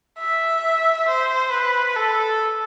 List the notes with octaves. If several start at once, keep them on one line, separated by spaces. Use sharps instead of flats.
E5
C5
B4
A4